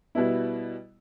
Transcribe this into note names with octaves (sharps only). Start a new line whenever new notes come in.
B2 G3 B3 E4